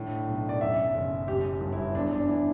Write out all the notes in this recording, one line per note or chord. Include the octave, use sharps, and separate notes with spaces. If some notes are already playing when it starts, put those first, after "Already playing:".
Already playing: A2 D3
B1
D5
F#2 E5
F#1
F#2 G4
G1
E4
E2 D4
D4
E3 E4